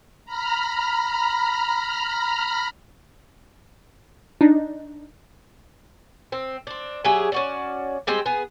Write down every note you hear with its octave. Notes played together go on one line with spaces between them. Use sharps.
A#5 B5 F6
D4 D#4
C4
C4 D4
F#3 G4 G#4 E5
C#4 F#4 D5
G3 G#3 C4 C5
B3 G#4